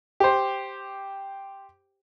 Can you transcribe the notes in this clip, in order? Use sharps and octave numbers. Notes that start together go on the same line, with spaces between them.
G4 C5